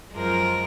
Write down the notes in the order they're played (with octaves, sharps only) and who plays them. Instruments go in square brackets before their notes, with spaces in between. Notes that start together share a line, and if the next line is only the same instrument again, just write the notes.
[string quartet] F#2 F3 G#3 A#4